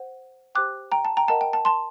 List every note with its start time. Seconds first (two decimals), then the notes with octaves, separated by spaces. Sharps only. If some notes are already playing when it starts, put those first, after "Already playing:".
Already playing: C5 F#5
0.55 G4 C5 G5 D6 F#6
0.92 G5 A#5
1.05 A5
1.17 G5 A#5
1.28 A#4 D#5 F#5 A5
1.41 G5
1.53 A5
1.65 A5 C6